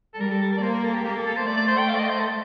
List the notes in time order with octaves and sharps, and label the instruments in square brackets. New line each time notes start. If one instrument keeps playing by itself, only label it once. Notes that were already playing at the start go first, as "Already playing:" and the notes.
[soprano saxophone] A4
[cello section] G3 [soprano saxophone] A#4
[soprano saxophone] A4
A4
A#4
D5
[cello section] A#3 [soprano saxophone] C5
[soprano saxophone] A#4
A4
G4
[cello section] A#3 [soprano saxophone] G4
[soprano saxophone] A4
A4
C5
[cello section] A3 [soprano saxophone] D5
[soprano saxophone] D5
C5
G5
F5
D5
D#5
C5
A4